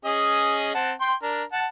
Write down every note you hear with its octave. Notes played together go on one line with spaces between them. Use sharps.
C#4 G#4 D#5
C4 F#5 A5
G5 C6
D4 A#4
F#5 A5